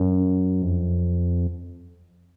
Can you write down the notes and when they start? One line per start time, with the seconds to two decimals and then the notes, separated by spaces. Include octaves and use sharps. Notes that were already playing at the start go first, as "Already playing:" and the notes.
Already playing: F#2
0.62 F2